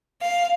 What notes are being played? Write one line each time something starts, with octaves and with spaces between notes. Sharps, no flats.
F5